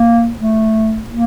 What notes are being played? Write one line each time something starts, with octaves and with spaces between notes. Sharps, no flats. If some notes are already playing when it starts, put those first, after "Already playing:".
Already playing: A#3
A3
A#3